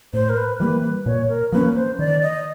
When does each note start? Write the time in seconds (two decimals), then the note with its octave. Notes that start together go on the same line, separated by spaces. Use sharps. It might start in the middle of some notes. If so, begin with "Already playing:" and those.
0.13 A2 C5
0.29 A#4
0.37 B4
0.59 E3 G3 A#3 B4
0.83 B4
1.06 A#2 C#5
1.29 A#4
1.52 F3 A#3 C#4 B4
1.75 C5
1.99 D#3 D5
2.22 D#5